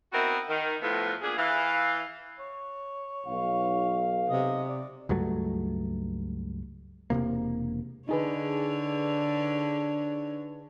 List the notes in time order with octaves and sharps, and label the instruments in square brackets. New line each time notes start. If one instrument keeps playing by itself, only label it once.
[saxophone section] B3 C4 D#4 E4 F#4 A#4
D#3
A2 F3 B3
A#2 B3 D4 G#4
E3 F5
[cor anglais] C#5
[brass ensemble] B1 F5
[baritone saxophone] C3 [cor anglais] D#5
[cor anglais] D5
[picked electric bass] C#2 G2 F#3 A3
E1 E2 C3 A#3
[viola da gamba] D3 C#5 [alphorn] D4 [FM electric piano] D#4 G#4 B4